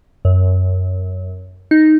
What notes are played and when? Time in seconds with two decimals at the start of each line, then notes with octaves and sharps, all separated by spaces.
0.25 F#2
1.71 D#4